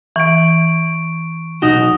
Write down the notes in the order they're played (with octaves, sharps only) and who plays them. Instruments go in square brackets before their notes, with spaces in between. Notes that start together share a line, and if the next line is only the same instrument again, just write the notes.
[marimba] E3 [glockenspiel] C#6 D7
[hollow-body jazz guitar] B1 D#4 F#4 [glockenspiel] D#6 A#6 G7